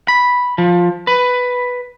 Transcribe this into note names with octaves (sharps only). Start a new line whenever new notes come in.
B5
F3
B4